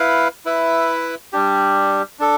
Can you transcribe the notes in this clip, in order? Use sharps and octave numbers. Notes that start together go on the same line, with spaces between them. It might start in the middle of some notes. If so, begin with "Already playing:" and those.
Already playing: E4 B4 F5
E4 B4 E5
G3 D4 G4
D4 A4